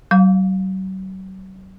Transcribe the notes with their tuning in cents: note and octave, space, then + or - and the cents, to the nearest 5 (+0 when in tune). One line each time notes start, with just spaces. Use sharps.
F#3 +40 F5 +30 D6 -35